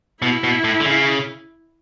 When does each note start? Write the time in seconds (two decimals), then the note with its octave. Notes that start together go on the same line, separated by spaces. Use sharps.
0.22 B2 E4
0.44 B2
0.64 A2
0.80 D3
0.86 C#3